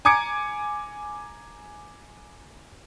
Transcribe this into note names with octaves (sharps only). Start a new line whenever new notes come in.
G#5 A#5 D6 G#6 C#7 D7